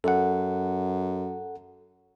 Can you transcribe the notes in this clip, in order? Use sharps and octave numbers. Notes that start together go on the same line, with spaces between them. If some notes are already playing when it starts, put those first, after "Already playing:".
F#2 A4 F#5